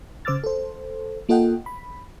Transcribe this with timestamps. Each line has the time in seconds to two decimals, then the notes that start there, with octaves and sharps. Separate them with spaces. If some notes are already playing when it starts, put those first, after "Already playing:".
0.25 C#3 C5 D6 E6 F6 A6
0.44 A4 C5
1.29 A#3 F4 A4 D#5 F#5 G5
1.66 B5